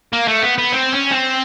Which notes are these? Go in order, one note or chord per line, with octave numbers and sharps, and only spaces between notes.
A#3
A3
B3
B3
C4
C#4
C4